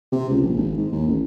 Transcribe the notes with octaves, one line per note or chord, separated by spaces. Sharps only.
C3
C#2
A#1
G#1
G#2
D#2
A1